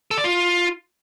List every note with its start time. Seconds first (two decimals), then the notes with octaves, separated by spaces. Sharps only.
0.11 A4
0.18 D5
0.24 F4